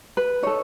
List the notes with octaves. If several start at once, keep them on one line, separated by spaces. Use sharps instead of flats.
B4
D#4 A4 C#5